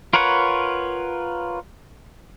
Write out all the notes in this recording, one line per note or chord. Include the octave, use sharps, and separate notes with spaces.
F4 A#4 B4 C#5 F#5